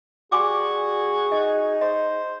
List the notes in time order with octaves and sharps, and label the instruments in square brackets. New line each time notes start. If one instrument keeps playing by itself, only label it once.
[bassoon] G3 [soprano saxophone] F#4 [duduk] G#4 [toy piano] G#5 C6 D6
[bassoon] D#4 [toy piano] D#5
[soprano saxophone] C5 [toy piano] D#5